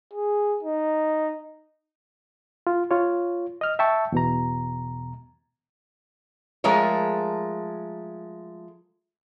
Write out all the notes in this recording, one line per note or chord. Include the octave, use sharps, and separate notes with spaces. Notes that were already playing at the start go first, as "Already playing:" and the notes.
G#4
D#4
F4
F4 C#5
D#5 F6
E5 G5 A5 C#6
E2 B2 A#5
F3 G#3 A3 A#4 C#5